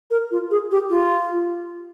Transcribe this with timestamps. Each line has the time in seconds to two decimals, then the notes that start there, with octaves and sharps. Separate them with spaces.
0.11 A#4
0.31 F4
0.51 G#4
0.71 G4
0.90 F4